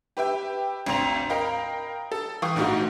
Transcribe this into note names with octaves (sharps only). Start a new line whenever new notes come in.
G4 B4 E5 G5
G#1 D2 C4 A#5 C6 F7
A#4 D#5 F5 G5 B5
A4
E3 F5 G5 C#6 D#6
A#1 G#2 A3 D#4 F#4